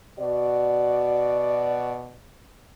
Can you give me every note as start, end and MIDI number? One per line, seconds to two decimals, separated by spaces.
0.20 2.15 47
0.20 2.15 66
0.20 2.15 74